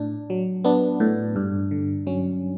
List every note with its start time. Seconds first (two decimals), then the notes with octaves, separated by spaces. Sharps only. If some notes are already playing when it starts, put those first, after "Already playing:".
Already playing: A2 D4
0.30 F#3
0.64 B3 D4
1.00 A2
1.36 G2
1.71 D3
2.07 F#3 C#4